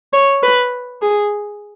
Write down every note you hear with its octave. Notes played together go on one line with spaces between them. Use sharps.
C#5
B4
G#4